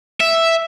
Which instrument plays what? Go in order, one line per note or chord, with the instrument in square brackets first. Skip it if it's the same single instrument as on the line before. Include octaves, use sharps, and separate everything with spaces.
[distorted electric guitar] E5